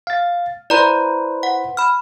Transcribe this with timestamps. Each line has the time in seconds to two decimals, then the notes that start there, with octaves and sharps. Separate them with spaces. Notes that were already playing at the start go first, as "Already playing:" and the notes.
0.07 F5 A6
0.70 E4 B4 C5 D5 A#5
1.43 F#5
1.77 B5 F6